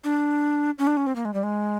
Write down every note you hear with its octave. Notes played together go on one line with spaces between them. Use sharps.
D4
C#4
D4
C#4
C4
A#3
G#3
G3
G#3